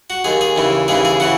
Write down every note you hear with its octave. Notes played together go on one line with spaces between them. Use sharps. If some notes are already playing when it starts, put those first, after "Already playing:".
F#4
D#2 D#3 G#4
G#4
D#2 C#3 E3
D#2 C#3 E3 G#4
G#4
C#3 E3 F#4